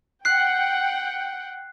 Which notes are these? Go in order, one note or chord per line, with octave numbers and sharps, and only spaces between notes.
F#5 G5 F#6 C7